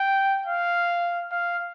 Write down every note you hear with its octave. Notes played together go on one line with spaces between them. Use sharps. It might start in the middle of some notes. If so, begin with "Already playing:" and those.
Already playing: G5
F5
F5